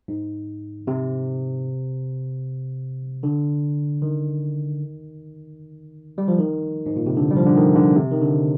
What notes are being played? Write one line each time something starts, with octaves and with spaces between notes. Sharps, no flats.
G#2
C3
D3
D#3
G3
F3
D#3
G#2
A#2
C3
D3
G3
F3
D3
D#3
D3
C3
D#3
D3